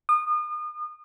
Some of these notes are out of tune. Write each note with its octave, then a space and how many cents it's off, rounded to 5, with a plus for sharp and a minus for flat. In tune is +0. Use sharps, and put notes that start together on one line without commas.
D#6 -35